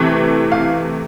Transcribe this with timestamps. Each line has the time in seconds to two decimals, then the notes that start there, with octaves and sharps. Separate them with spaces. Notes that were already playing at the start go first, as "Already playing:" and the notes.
Already playing: C3 E3 A3
0.52 F5